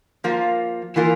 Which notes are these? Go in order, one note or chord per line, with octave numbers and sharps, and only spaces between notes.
F3 A#3 F4
E3 A#3 F4 A#4